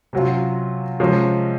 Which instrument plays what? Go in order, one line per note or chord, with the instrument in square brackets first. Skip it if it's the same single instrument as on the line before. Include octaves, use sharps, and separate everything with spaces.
[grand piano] C3 F#3 C#4 F4
C3 F3 G#3 C#4